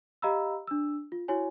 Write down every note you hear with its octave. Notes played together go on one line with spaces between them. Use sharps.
G4 D#5 F5 A#5 B5 E6
D4 E6
F4
E4 F#4 C#5 G#5